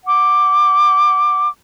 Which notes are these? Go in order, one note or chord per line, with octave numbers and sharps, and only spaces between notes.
F#5 D6